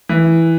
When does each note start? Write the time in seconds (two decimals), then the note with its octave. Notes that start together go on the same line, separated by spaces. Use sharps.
0.09 E3